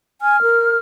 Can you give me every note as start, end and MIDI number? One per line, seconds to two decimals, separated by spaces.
0.22 0.40 80
0.22 0.78 89
0.42 0.77 70